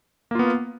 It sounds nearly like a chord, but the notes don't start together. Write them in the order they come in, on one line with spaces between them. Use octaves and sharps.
A#3 F4 B3